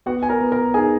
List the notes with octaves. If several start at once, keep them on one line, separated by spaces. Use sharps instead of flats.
B3 F#4 F#5
G#5
A#4 A#5
B3
A#4 A#5
D#4 G#4 G#5